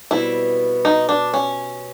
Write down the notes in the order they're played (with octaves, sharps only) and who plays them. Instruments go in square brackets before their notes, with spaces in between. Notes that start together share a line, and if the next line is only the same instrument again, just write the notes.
[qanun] B2 G3 C4 [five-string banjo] E4
[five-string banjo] D#4
D4
C#4